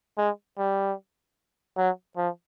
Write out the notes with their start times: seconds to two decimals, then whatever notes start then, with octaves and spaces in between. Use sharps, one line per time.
0.18 G#3
0.58 G3
1.78 F#3
2.17 F3